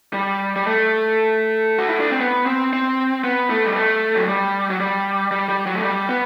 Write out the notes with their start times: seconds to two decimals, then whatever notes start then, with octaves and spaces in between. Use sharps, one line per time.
0.13 G3
0.56 G3
0.66 A3
1.78 F#4
1.88 E4
2.00 D4
2.11 C4
2.20 B3
2.46 C4
2.73 C4
3.24 B3
3.50 A3
3.66 G3
3.76 A3
4.16 F#3
4.28 G3
4.70 F#3
4.80 G3
5.31 G3
5.49 G3
5.66 F#3
5.75 A3
5.84 G3
6.09 B3